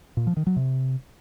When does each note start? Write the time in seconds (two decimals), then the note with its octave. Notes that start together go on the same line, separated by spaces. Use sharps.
0.17 A#2
0.27 F3
0.37 D#3
0.47 F#3
0.56 C3